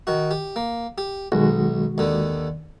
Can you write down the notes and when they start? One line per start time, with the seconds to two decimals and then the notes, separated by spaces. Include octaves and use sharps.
0.07 D#3 F#4
0.31 G4
0.56 A#3
0.98 G4
1.32 B1 D#3 G#3 F#4
1.98 D#2 D3